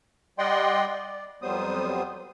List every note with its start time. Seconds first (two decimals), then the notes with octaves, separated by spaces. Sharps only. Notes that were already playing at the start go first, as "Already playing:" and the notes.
0.39 G3 D5 D#5 F#5 G5 C6
0.87 D5
1.42 F2 F#3 G3 B3 C5 D#6